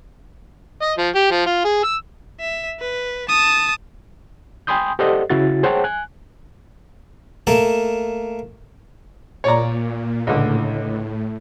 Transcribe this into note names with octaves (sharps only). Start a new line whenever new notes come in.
D#5
F3
G4
F3
F4
G#4
E6
E5
B4
A5 D#6
G5 G#5 B5 C6 D#6 G6
G4 A4 C5 D5 D#5 F#5
C#3 E4 F#4 A6
G#4 C5 C#5 F#5 G5 A5
G#5 F#6
A3 A#3 A#4 A5
A#2 C#5 D5 A#5
C#2 A2 D3